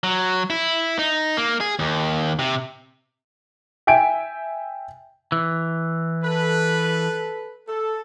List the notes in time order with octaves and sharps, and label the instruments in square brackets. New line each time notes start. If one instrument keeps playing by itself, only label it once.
[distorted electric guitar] F#3
E4
D#4
A#3
G#4
D#2
C3
[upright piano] E5 G5 G#5 D7
[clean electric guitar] E3
[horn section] A4 B4
A4